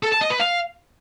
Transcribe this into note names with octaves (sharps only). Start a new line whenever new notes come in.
A4
A5
D#5
B4
F5